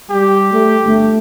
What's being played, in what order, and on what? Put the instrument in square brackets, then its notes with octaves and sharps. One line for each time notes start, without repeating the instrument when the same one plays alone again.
[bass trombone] G3 [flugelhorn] G4
[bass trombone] A3
[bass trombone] G1 [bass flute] A3